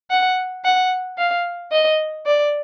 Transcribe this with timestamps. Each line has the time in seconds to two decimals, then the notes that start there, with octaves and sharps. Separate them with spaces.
0.10 F#5
0.65 F#5
1.18 F5
1.72 D#5
2.26 D5